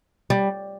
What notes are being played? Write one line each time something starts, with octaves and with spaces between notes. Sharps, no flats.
G3